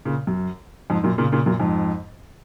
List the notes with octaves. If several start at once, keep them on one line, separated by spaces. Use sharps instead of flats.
A#2 C#3
F#2
F2 G#2
F#2 A#2
A#2 C#3
A#2 C#3
F#2 A#2
F2 G#2